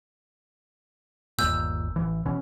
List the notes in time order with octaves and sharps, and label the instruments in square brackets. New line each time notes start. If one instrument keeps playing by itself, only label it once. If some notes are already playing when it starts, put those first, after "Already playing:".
[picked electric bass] G1 D#2 A#2 [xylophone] E6 G6
[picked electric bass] A1 E3
B2 E3 C#4